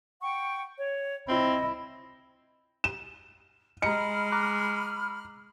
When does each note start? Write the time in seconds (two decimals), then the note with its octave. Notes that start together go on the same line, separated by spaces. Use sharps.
0.22 F#5 G5 C#6
0.78 C#5
1.28 C4 E4 D#5
2.84 E7
3.82 G#3 D#5 A#5 B5 F6 C#7
4.32 A#5 D6 F#6